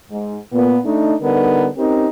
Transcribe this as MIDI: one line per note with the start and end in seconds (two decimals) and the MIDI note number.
0.10 0.37 44
0.53 0.78 46
0.53 0.78 59
0.84 1.14 57
0.84 1.14 62
0.84 1.14 63
1.21 1.68 50
1.21 1.68 55
1.21 1.68 59
1.21 1.68 63
1.21 1.68 70
1.77 2.07 60
1.77 2.07 61
1.77 2.07 63
1.77 2.07 67
1.77 2.07 70